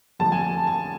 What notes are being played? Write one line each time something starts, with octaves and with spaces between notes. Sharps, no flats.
F2 D3 F3 A3 A5
G#5
A5